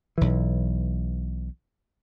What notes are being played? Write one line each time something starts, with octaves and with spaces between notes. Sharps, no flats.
B1 E3